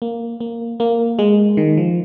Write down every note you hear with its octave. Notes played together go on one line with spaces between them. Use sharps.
A#3
A#3
A#3
G#3
D#3
F3